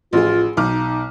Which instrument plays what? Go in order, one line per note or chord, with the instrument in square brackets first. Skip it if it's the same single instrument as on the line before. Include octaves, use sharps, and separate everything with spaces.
[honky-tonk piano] A1 F3 G#4 [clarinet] F4
[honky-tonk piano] B1 D6 F6 [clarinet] D#4